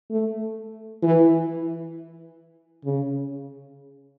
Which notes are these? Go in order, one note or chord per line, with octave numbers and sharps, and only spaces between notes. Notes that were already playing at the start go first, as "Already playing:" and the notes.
A3
E3
C#3